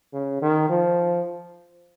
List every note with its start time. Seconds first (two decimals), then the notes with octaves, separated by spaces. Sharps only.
0.13 C#3
0.42 D#3
0.70 F3